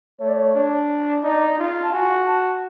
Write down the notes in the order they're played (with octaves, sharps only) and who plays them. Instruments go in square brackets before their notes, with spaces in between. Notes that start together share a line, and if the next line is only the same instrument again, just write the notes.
[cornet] A3 [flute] C#5
[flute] D5
C#5
[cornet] D4
[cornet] D#4 [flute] D5
[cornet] F4
[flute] A5
[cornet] F#4 [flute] G#5
[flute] A5